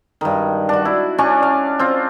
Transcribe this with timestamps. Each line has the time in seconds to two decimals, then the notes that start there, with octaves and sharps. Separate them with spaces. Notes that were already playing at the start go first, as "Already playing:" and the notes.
0.21 G2 D#3
0.69 D4 F#4
0.85 E4
1.18 C#4 D4 G#5 C#6
1.43 F5
1.79 C4 F4